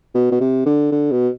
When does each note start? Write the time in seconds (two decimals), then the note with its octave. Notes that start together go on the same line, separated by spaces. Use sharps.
0.15 B2
0.32 B2
0.41 C3
0.66 D3
0.92 D3
1.11 B2